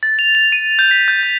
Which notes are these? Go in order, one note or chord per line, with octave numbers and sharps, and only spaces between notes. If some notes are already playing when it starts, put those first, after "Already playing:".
A6
F7
F7
D#7
G6
B6
G6
A6